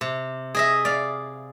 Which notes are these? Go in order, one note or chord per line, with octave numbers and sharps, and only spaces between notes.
C3
G#4 D#5 E5
D5 F5